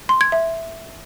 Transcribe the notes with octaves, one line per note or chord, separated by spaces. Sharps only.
C6
G#6
E5